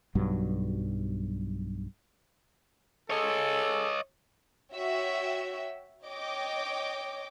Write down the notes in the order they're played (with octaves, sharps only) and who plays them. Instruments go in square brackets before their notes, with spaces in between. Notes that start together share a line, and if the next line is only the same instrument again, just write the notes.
[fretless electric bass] B1 G2 F#3
[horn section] C#4 G#4 A4 [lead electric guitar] C#5 D#5
[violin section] F#4 C#5 E5 G5
C#5 D#5 G5 D6